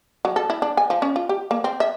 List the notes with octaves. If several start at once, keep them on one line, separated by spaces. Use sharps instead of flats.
F#3
A4
E4
D4
G#5
F3
C#4
F4
G4
A#3
C4
E5